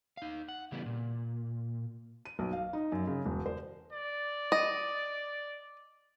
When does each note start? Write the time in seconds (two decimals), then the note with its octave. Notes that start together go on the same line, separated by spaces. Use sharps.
0.17 D#4 F5
0.48 F#5
0.72 C#3 E3 G3 A3 B3
0.86 A#2
2.25 D#7
2.39 B1
2.53 F5
2.73 D#4
2.92 F#2
3.07 C#3
3.26 E1
3.46 C5
3.93 D5
4.52 D#5